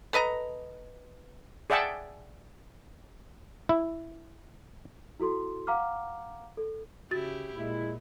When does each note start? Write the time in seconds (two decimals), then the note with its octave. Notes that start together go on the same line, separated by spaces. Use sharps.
0.13 A4 B4 D#5 A#5
1.70 G#4 D5 E5 F#5 G5 A5
3.69 E4
5.20 E4 F#4 A4 C6
5.67 F5 F#5 A#5 D6 F6
6.57 A4
7.11 C#3 E4 F#4 G4 A6
7.55 A#2 G#3 E4